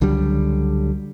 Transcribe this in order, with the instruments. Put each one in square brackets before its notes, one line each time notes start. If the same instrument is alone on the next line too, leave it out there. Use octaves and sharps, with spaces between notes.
[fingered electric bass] C#2 D3 F#3 G3